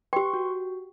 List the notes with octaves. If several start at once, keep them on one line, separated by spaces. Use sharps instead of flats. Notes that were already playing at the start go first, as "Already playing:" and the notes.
G4 B4 G5 C6 C#6
F#4